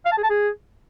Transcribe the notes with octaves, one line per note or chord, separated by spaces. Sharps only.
F5
A5
G#4
A5
G#4